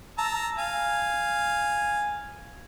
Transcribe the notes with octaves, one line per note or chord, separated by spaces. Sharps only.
A5 A#5 E6
F5 G#5